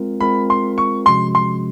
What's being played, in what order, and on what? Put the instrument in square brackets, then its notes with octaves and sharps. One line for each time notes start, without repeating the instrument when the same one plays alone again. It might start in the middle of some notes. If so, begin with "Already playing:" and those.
Already playing: [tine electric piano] G#3 C4 F4 A#4
[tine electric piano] G#3 C4 F4 A#4 [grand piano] B5
[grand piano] C6
C#6
[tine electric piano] C3 F3 G#3 C#4 F#4 [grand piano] C6
[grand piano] C6